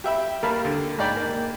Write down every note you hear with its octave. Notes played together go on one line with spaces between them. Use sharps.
G4 E5 B5
D#2 G3 A#4 F5 A5 B5
D3
D#2 G#2 D#4 D5 G5 B5
A#3